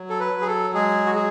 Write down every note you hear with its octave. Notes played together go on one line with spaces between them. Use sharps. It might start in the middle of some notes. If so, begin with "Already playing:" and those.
Already playing: F#3
A4
B4
F#3
G#4
A4
G#3 G#4
F#4
G#4